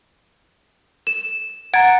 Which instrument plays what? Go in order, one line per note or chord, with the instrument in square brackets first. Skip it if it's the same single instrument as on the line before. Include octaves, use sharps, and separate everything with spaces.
[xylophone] E7
[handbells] F#5 A#5 [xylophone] G#6 A6 D7